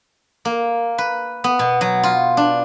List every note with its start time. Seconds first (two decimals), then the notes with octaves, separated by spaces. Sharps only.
0.45 A#3
0.98 B4
1.44 B3
1.59 B2
1.81 F#3
2.03 F4
2.37 D4